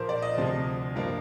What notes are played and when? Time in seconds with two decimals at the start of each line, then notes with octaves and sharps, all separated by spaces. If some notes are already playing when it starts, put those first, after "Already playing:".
Already playing: A#2 F3 A#3 A#4 C5
0.09 D5
0.22 D#5
0.38 D2 C3 F3
0.95 G2 F3 A#3 F5